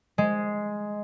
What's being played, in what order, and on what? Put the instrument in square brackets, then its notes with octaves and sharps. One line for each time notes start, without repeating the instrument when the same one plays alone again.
[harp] G#3